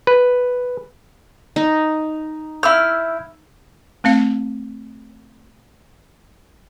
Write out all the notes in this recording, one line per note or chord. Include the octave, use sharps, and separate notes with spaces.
B4
D#4
E4 B5 E6 F6 G6
A3 C4 F5